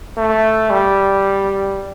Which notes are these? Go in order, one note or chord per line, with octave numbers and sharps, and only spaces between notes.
A3
G3